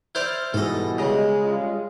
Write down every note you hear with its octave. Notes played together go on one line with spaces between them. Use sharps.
E4 C5 D5 F6 G6
G#2 B2 E3 G3 A4 D#5
C#3 G#3 D#5
G3 C#4 F4